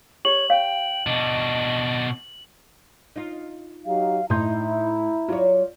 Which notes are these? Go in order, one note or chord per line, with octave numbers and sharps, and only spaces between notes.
G4 C#5 F#7
C#5 F5 G5
B2 D4 D#5
D#4 F4
F#3 D#4 G4 F5
A2 D#4 E4 A#5 C6 G6
F#3 F4 C#5 D5